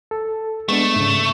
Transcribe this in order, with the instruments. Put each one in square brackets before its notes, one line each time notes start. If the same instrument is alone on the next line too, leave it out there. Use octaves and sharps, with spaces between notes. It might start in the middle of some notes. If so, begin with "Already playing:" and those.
[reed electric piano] A4
[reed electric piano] G#3 B3 D4 [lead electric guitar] A3
[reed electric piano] G#2 C#3